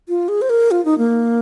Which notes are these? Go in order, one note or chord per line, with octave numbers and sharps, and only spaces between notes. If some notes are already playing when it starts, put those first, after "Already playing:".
F4
G#4
C5
A#4
F4
D#4
A#3